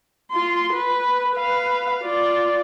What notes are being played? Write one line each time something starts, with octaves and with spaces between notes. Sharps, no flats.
F4 C6
B4
B4 F5
F4 D5